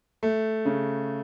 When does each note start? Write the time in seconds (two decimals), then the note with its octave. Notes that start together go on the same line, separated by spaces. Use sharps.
0.23 A3
0.65 C#3